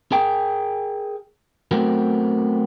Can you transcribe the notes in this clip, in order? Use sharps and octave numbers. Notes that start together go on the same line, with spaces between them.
G#4 A#4 G5
F#3 A3 B3 C4 F#4 A#4